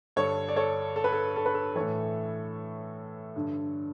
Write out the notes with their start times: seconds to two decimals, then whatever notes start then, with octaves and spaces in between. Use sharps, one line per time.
0.16 G2 D3 A4 C#5
0.49 D5
0.56 A4 C#5
0.96 A4
1.04 B4
1.12 A4
1.36 A4
1.46 B4
1.54 A4
1.75 A2 E3 A4 C#5
3.36 G2 D3